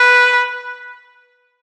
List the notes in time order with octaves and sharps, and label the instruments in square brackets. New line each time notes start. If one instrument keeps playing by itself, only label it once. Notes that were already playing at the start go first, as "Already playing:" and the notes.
Already playing: [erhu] B4